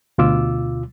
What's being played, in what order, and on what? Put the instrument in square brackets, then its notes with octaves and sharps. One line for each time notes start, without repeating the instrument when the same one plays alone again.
[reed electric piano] D2 B2 F4 D6 E6